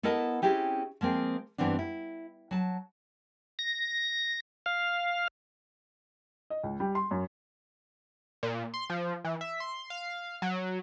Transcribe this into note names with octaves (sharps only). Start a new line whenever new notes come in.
B3 E4 A4 A#4 D#5 A5
C4 C#4 E4 G4 G#4
F3 G#3 A#3 C4
G2 A#2 E3 B3 C4 D4
E4
F#3 A5
A#6
F5
D#5
C#2
G3
C6
F#2
A#2
C6
F3
E3
E5
C6
F5
F#3